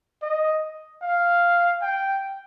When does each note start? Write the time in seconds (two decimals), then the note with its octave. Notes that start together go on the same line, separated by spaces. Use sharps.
0.22 D#5
1.02 F5
1.81 G5